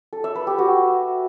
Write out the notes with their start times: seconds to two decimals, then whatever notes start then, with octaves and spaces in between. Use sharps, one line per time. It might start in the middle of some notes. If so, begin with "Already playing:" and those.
0.13 A4
0.24 E5
0.35 B4
0.47 G4
0.58 F#4